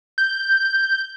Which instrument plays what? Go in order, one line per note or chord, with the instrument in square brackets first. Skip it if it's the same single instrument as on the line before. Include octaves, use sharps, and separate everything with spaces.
[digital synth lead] G6